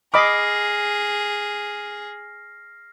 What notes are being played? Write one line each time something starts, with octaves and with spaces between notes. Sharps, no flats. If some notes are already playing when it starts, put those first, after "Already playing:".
G#4 D#5 B5 D6 F6 A#6 C7